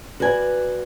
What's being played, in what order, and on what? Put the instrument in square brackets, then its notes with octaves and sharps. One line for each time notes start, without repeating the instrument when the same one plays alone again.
[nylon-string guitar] F#4 B4 D5 G#5